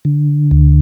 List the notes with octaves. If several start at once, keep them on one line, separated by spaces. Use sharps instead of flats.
D3
D2